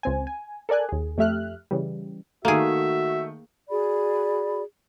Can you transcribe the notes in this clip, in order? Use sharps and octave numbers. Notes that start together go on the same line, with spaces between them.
C#2 C4 G#5
G#5
A4 A#4 D5 G#5 F#6
D#2 G#4
F2 A3 G4 E5 F6 F#6
C#3 E3 G3
D#3 A3 A#3 F#4 G#4 E5
F#4 G#4 D5 B5